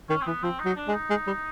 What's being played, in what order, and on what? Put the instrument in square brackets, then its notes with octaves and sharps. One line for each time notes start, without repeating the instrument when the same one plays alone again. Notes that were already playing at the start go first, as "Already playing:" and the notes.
[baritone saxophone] D#3 [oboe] C#4
[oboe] C4
[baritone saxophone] E3 [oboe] B3
[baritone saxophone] F3 [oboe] C4
[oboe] D#4
[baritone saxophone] F#3
[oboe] D4
[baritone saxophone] G#3
[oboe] D#4
[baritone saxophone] G#3
G3